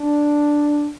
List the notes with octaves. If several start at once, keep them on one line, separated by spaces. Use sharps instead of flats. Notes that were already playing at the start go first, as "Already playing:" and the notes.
Already playing: D4